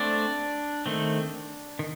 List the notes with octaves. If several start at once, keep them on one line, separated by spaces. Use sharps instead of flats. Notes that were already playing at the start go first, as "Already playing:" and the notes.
Already playing: A3 C4 D4 D5
D#3 A3 C4
D#3